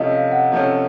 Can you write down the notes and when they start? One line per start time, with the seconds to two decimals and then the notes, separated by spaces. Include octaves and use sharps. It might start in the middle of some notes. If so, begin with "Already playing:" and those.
Already playing: C3 F3 A3 C#4 D#5 F5
0.12 F5
0.32 F#5
0.52 C3 F3 A3 C#4